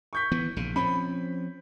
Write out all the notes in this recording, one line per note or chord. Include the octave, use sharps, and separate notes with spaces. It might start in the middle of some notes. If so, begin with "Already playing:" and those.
C#6 G6 B6
E3 B3
A#1 C#3
F3 C4 C#4 B5